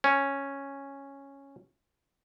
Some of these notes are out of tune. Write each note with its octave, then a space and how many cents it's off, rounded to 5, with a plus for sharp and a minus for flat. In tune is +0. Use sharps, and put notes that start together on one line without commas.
C#4 -5